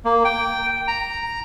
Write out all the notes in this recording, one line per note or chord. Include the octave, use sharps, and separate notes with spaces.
A#3
G5
A#5